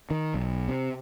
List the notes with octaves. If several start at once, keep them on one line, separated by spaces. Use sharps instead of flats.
D#3
B1
C3